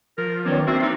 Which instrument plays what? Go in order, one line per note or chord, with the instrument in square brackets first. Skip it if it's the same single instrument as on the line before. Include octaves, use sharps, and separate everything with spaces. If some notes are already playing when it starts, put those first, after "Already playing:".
[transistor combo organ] F3 [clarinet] A#4
[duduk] D#3 [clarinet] F#3 [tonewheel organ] B3 C#4 D5
[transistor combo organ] A#3 D4 [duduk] C4 [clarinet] F#4 [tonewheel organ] E5 C6
[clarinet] D#4